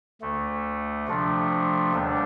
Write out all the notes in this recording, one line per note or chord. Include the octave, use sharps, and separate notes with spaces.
D2 D3 A3
C3 F3 A3 D4
D#2 D3 G3 D4